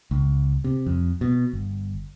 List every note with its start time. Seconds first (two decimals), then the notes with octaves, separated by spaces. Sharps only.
0.11 C#2
0.64 C3
0.86 F2
1.21 B2
1.53 G1